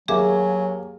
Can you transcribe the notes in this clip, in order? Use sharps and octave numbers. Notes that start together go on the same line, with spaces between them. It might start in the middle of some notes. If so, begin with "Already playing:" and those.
D#2 F#3 A3 A#3 G#4 E5 G#5 D6